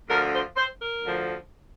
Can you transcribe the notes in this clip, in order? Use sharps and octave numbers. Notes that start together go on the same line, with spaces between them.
D2 D3 F3 A#4
C5
C5
A#4
D2 D3 F3